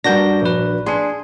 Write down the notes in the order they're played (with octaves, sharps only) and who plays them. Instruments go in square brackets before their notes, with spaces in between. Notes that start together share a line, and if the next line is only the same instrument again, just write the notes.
[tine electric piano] G2 G6 A#6 [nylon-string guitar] D4 F#4 A#4
[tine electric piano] A#1 B4
[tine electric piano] D4 C6 [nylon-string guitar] G#4